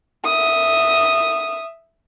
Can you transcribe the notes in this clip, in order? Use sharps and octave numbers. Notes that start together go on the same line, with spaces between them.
E5 D#6